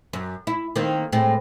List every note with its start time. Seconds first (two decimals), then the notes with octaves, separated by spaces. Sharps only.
0.13 F#2
0.47 E4
0.76 D#3 A#3 C4
1.12 A2 G#3 C4